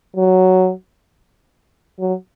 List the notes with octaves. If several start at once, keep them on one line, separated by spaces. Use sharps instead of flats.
F#3
F#3